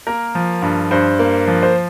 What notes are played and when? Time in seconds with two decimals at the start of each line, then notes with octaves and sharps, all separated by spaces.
0.07 A#3 A#4
0.35 F3
0.62 G2
0.91 G2 C5
1.19 A#3
1.47 F3
1.63 C5